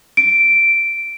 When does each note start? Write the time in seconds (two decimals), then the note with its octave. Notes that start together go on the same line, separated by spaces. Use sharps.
0.17 D7